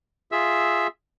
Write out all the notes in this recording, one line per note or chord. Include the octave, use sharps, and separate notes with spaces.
F4 G#4 E5 E6